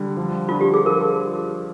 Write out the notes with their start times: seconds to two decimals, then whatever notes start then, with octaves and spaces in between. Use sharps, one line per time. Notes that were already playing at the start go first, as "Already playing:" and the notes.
Already playing: D3 G3
0.17 F3
0.49 D4 F4
0.61 G4
0.74 G#4
0.85 F3 A#4